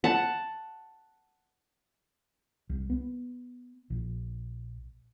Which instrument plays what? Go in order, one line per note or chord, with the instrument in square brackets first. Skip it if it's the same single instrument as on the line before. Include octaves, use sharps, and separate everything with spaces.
[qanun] F#5 A5
[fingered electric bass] C2
B3
A#1